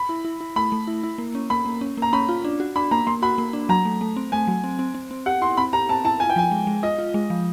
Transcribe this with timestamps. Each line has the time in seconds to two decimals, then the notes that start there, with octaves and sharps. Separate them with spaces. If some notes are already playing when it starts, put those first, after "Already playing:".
Already playing: B5
0.09 E4
0.25 E4
0.41 E4
0.56 A3 B5
0.72 A3
0.87 E4
1.03 E4
1.18 A#3
1.35 C#4
1.50 A#3 B5
1.66 A#3
1.81 C#4
1.97 A#3 A#5
2.13 C#4 B5
2.29 F4
2.44 D4
2.60 F#4
2.76 D4 B5
2.91 A#3 A#5
3.07 A#3 C6
3.22 F#4 B5
3.38 A#3
3.53 D4
3.69 F#3 A#5
3.85 A3
4.01 A3
4.16 C4
4.32 A3 G#5
4.47 F#3
4.64 C4
4.79 C4
4.94 C4
5.11 C4
5.26 G4 F#5
5.41 E4 C6
5.57 C4 B5
5.73 G4 A#5
5.89 C4 A5
6.05 E4 A5
6.20 F4 G#5
6.30 G5
6.36 F3 G#5
6.52 G#3
6.67 G#3
6.83 F4 D#5
6.99 F4
7.14 G#3
7.30 F3